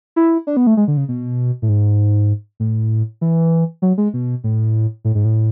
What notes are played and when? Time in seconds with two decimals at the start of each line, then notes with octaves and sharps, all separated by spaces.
0.16 E4
0.47 D4
0.57 B3
0.67 A3
0.77 G#3
0.88 D3
0.97 C#3
1.08 B2
1.62 A2
1.69 G#2
2.60 A2
3.21 E3
3.82 F#3
3.98 G#3
4.14 B2
4.44 A2
5.05 A2
5.15 G#2
5.25 A2